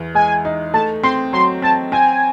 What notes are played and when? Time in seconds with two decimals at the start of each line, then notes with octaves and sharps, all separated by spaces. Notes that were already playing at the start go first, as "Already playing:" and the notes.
Already playing: E2
0.15 G#3 G#5
0.45 D#4
0.74 A3 A5
1.04 C4 C6
1.33 F#3 C6
1.62 C4 A5
1.92 C4 G#5